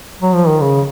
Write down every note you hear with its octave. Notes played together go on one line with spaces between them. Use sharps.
F#3
F3
D#3
C#3